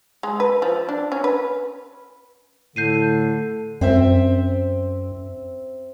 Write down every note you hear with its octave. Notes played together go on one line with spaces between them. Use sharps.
G#3
B4
F3
D4
C#4
B4
A2 D3 G6 C7 D#7
F#2 C4 C5 E5